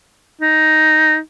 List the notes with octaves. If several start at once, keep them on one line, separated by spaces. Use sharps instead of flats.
D#4